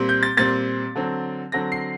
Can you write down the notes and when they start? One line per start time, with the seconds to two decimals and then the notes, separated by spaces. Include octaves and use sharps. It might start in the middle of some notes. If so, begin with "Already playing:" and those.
Already playing: A#2 G3 C4
0.09 G6
0.23 A6
0.37 A#2 G3 C4 A6
0.96 D3 F#3 C4
1.52 D3 F#3 C4 A#6
1.72 C7